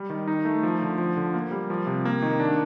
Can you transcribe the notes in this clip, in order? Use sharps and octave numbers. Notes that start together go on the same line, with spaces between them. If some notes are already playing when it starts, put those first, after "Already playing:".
Already playing: G3
D#3
D#4
A3
F3
D3
F3
D3
A#3
G3
F3
C3
A#3
D#3
D4